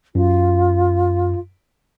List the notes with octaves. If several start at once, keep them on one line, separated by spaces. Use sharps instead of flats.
F#2 F4